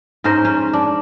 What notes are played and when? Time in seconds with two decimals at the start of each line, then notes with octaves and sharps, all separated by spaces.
0.24 G#2 C#4 A#4 C5
0.45 C#4
0.73 D4